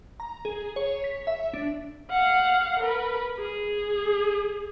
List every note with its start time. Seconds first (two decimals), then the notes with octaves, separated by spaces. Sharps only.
0.20 A#5
0.45 G#4
0.76 C#5
1.04 B6
1.27 E5
1.54 D4
2.10 F5 F#5
2.80 A#4 B4
3.39 G#4